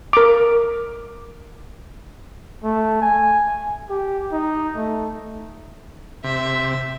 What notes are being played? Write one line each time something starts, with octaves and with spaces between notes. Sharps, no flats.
A#4 D6
A3
G#5
G4
D#4
A3
C3 E5